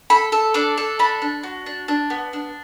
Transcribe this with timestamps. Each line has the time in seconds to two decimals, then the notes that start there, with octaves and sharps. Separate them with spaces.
0.10 A4 B5
0.32 A4
0.54 D4 D6
0.78 A4
0.99 D4 B5
1.22 D4
1.43 F#4
1.66 D4
1.88 D4
2.10 B3
2.33 D4